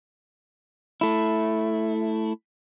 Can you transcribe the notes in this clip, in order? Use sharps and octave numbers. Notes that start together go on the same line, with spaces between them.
A3 E4